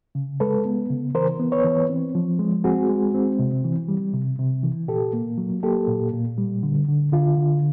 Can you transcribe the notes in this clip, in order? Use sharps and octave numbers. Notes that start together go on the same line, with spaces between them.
C#3
G#3 A4 B4
B3
C#3
E3 A#4 C5
B3
B4 C#5
E3
C4
F3
G#3
C4 F#4 G#4
G#3
C4
C3
E3
G3
C3
C3
E3
A#2 G4 A4
A#3
F#3
A#3 G4 A4
A#2
A#2
G3
D3
D3
D3 F4
D3